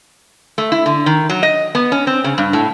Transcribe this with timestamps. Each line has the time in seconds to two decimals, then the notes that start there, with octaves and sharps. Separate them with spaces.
0.58 A3
0.72 E4
0.86 D3
1.06 D#3
1.29 F#3
1.43 D#5
1.75 B3
1.92 C#4
2.07 C4
2.24 C#3
2.38 G2
2.53 A2